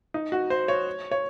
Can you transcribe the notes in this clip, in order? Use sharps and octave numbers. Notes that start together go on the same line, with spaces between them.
D#4
F#4
C5
C#5
C#5